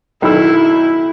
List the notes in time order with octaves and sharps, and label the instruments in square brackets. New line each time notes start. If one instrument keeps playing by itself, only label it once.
[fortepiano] B1 D#3 E6 [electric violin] E4